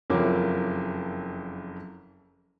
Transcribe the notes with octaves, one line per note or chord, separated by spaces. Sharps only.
F#1 F2 F#3 A#3 E4 D6